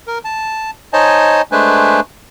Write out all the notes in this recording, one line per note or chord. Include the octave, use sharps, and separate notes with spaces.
A#4
A5
D#4 C5 C#5 D#5 G#5 A5
G#3 A3 D4 B4 C5 G#5